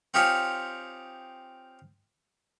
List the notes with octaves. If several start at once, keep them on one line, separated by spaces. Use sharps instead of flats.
C4 D#4 F4 G4 C#5 G#5